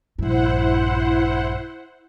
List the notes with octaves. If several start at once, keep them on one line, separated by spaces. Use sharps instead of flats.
A#1 G2 E4 C5 F#5